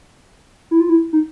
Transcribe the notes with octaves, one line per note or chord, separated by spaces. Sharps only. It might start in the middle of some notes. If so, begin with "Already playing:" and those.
E4
F4
E4
D#4